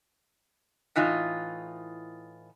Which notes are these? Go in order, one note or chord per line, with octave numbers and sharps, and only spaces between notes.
A2 E3 D#4 F4